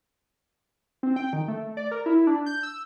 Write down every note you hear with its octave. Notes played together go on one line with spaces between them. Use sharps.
C4
G5
D#3
A3
D5
A#4
E4
D4
G6
E6